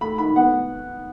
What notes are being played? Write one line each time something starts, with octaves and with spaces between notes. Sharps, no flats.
A3 B5
D#3 B5
B3 F#5